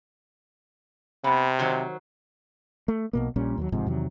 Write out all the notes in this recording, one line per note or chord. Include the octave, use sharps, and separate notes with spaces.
C3 B3
D#3 F#3 C5
A3
B1 B2 A#3
A#1 A#2 G3 C#4
D#2 F3 F#3
G1 G#2 C3 F3
E2 C3 D#3 F#3